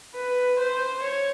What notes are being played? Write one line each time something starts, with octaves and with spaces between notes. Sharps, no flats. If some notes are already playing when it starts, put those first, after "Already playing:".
B4
C5
C#5